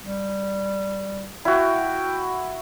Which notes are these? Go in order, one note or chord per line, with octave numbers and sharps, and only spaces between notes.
G3
E4 F#4 G5